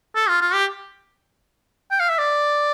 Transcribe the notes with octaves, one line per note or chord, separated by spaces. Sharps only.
A4
F4
F4
G4
G5
F5
E5
D5